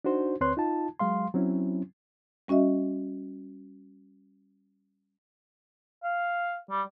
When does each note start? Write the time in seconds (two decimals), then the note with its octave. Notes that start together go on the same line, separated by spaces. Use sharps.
0.05 D4 D#4 F#4 C5
0.41 D2 C4 B4 C#5 C6 F#6
0.57 D#4 F4 A5
0.99 F#3 G#3 F5 C6
1.34 F#3 C4 C#4 E4
2.48 G3 C#4 F#4 D#5 E5
6.03 F5
6.70 G3